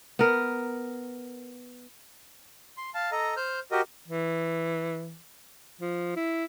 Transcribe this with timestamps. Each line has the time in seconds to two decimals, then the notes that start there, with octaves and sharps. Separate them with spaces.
0.19 B3 A#4
2.77 C6
2.94 F5 A5
3.12 A4 D#5 A#5
3.37 C5 F6 G6
3.71 F#4 G4 A#4 D#5
4.08 E3
5.81 F3
6.16 E4